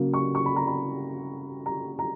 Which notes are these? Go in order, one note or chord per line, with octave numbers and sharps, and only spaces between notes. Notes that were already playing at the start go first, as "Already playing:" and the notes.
Already playing: C#3 F#3 A#3
C#6
C#6
B5
A#5
B5
A#5
A#5